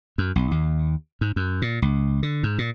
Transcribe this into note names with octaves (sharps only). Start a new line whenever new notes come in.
F#2
B1
D#2
G#2
F#2
A#2
C#2
D3
G#2
A#2